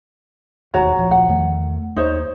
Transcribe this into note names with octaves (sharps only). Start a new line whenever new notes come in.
E1 D#2 A2 F#4 C#5 A#5
D1 A#1 F3
F#5
E2 D#3 A3
D#2 D#4 C5 C#5